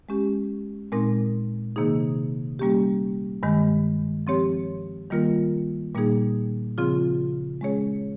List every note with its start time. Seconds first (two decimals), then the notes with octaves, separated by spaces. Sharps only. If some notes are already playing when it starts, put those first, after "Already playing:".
0.09 G#3 C#4 G4
0.92 A#2 G#3 C4 D#4 A#4
1.76 C3 D#3 A#3 D#4 G#4
2.59 G3 A#3 C#4 G4
3.43 G2 D#3 G#3
4.27 F3 C4 G4 C#5
5.10 D#3 G3 A#3 F4 A#4
5.95 A#2 G3 A#3 D#4 G#4
6.78 C#3 F3 C4 F4 G#4
7.61 G#3 C#4 G#4 C#5